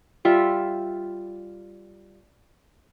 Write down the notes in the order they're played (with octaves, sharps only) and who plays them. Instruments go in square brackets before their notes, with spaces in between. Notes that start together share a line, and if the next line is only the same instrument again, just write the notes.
[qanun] G3 F4 E5